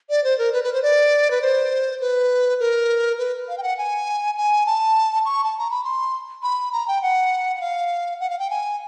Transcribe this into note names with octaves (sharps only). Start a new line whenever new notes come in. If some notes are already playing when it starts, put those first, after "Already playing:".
D5
C5
A#4
B4
B4
C5
D5
B4
C5
B4
A#4
B4
F5
G5
F#5
G#5
G#5
A5
C#6
A5
A#5
B5
C6
B5
A#5
G5
F#5
F#5
F5
F#5
F5
G5
G#5